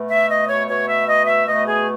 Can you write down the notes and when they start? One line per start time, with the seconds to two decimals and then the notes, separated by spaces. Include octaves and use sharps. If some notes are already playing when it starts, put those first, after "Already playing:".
Already playing: B2 A3
0.09 E5
0.29 D#5
0.48 C#5
0.68 B2 A3 C#5
0.88 E5
1.08 D#5
1.27 E5
1.47 B2 A3 D#5
1.66 G#4